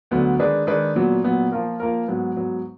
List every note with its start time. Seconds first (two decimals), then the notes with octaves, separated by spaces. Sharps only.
0.11 D2 D3 F#3 B3
0.39 D#3 G#3 D4 G#4 B4
0.67 D#3 G#3 D4 G#4 B4
0.96 A#2 F#3 B3
1.24 A#2 F#3 B3
1.52 F3 A#3 F4 A#4
1.80 F3 A#3 F4 A#4
2.08 G#2 F#3 B3
2.37 G#2 F#3 B3